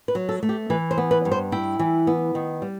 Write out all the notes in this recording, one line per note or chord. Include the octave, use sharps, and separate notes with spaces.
B4
F#3
A4
A3
G4
E3 B4
C5
B3
B4
G2
C5
E4 G5
E3
B3
D#3
G3